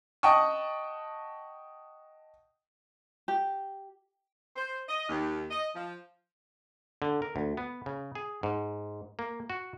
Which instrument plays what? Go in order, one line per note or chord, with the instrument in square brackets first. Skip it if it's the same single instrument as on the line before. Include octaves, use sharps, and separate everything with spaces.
[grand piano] D#5 F#5 G5 A5 C#6 D#6
[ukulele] G4
[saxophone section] C5
D#5
D#2
D#5
F3
[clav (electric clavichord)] D3
A#4
D2
B3
C#3
G#4
G#2
A#3
F#4